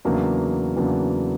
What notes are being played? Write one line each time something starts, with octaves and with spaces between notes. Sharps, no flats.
E2 C#3 F#3 A#3 D4
E2 C#3 F#3 A#3 D4